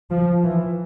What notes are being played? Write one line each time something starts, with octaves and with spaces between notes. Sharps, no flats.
F3
E3